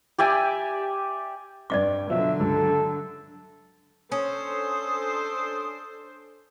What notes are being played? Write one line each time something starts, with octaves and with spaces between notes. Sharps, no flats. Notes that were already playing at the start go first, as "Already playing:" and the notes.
G4 D5 E5 G#5
G2 D5 D#5 D6
B2 D3 F3 F#3 E5
C#2 G2 A4
C#4 D4 A4 C5 D#6